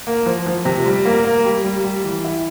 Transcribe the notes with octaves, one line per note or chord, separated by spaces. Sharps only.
A#3
F3
F3
C3
G3
A#3
A#3
G3
G3
G3
E3
E4